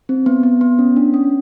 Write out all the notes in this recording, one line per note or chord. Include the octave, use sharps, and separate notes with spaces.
C4
B3
B3
B3
C#4
D4
C#4